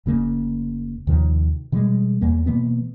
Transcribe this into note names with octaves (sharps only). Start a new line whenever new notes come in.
F1 C#3 A#3
D#2 C3 D#3 F3
B2 E3 G3 G#3
E2 A#3
B2 E3 A#3 B3